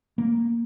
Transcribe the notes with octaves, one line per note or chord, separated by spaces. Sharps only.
A#3